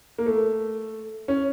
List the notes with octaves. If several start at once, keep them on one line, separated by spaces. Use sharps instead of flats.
A#3
A3
C#4